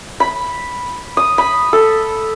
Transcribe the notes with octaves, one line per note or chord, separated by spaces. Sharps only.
B5
D#6
B5
A4